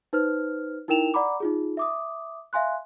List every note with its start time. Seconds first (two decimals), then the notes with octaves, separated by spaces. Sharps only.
0.13 D#4 B4 C5 F6
0.88 D#4 E4 A#4 G5 E7 F7
1.14 D5 F#5 A#5 B5 D6
1.40 D#4 F4 G#4
1.77 E5 D6 D#6
2.53 E5 F5 G#5 C6 F#6